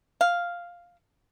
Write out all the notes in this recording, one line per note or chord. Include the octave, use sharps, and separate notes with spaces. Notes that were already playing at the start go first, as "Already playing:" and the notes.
F5